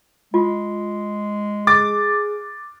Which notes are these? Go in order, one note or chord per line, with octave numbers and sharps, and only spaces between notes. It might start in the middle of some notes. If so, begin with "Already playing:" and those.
G#3 F4
G#4 D6 A6